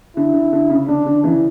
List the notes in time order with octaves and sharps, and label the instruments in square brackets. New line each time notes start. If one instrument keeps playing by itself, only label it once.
[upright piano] D3 [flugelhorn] E4
[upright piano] D3
D3
C#3
[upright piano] D3 [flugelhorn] D4
[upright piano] D3
C#3 E3